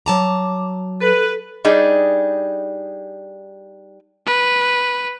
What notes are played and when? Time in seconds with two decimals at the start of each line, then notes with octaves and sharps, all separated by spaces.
0.06 F#3 A5 A#5 D6
1.01 A4 B4
1.65 G3 D4 D#4 G#4
4.27 B4